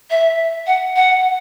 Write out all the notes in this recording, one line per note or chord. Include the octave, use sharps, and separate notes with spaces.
E5
F#5
F#5